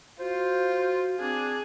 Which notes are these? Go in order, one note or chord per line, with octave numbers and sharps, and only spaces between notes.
F4 F#4 C5
C4 D4 G#4